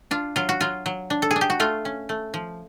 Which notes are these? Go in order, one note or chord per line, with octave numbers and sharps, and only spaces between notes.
D4 F4
F#3 F4
F#4
F#3 F4
F#3
D4
A4
G#4
D4
G4
F#4
A3 F4
C#4
A3
F3